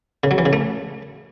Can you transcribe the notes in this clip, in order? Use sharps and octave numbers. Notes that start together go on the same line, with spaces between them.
C#3
F#3
E3
C#3
A3